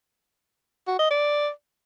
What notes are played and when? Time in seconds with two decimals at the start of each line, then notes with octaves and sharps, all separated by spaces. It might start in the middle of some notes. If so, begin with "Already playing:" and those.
0.87 F#4
0.99 D#5
1.11 D5